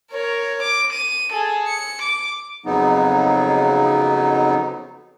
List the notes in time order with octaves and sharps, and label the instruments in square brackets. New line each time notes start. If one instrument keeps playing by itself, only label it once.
[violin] A#4 C#5
D6
D#7
G#4 A4
C#7
D6
[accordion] F2 C#3 F#3 B3 D#4